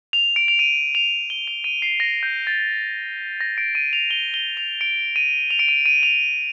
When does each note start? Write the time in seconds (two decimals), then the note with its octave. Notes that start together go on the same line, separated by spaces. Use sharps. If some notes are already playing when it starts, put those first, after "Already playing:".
0.13 F7
0.36 D7
0.48 F7
0.59 D#7
0.95 F7
1.30 G7
1.48 F7
1.64 D#7
1.82 C7
2.00 A#6
2.23 G6
2.47 A6
3.41 A#6
3.58 D7
3.75 D#7
3.93 F7
4.11 G7
4.34 G7
4.57 F7
4.81 D7
5.16 D#7
5.51 F7
5.59 D7
5.68 D#7
5.86 D#7
6.03 F7